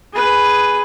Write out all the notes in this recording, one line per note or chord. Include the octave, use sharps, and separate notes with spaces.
G#4 B4